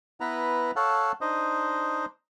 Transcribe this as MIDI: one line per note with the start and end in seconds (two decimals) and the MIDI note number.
0.20 0.71 59
0.20 0.71 64
0.20 0.71 71
0.20 0.71 82
0.76 1.12 69
0.76 1.12 73
0.76 1.12 77
0.76 1.12 78
0.76 1.12 81
1.21 2.06 62
1.21 2.06 63
1.21 2.06 72
1.21 2.06 75